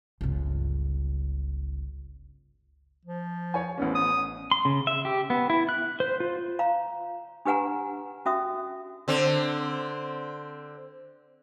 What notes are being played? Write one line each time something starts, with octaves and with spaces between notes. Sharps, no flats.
G1 C#2
F3
C#5 G#5
A1 B3 C#4
D#6
C6
C#3
E5
G4
B3
E4
F#6
C5
F4
F5 A#5
D4 G4 B4 F#5 G#5 A#5
C#4 F#4 E5 D#6
D3 C4